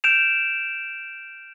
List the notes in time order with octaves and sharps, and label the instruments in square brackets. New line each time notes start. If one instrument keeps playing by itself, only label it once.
[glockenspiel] F6 G6 D7 E7 F7